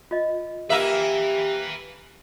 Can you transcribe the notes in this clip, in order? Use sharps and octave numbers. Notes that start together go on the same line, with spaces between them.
F4 D#5
A#3 G4 B4 E5 G#5